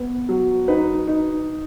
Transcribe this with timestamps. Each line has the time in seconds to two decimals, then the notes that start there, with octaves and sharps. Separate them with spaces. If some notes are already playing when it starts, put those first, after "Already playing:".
Already playing: B3
0.29 F#3
0.68 D#4 B4
1.07 D#4